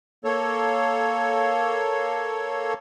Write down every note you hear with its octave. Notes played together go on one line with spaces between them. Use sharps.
A#3 A4 C#5